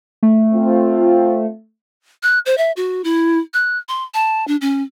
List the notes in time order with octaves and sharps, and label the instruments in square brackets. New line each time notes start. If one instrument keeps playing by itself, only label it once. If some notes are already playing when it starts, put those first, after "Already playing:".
[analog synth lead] A3
[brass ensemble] C4 F4
[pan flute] F#6
C5
E5
F#4
E4
F#6
C6
A5
D4
C#4